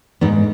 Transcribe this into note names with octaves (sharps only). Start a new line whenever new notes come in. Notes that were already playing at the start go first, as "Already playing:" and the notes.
G#2 B3 D#4